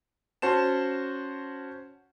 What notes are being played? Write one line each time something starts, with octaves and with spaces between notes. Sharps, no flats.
C#4 F#4 C5 A5 E7